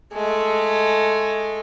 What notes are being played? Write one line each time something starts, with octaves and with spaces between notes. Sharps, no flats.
G#3 A3